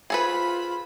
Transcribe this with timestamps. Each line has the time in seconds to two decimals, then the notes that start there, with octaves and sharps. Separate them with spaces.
0.10 F4 G#4 A4 B4 C5 B5